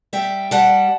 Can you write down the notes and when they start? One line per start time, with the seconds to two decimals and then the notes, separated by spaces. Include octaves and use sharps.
0.13 G3 E5 G5
0.51 G3 F#5 A5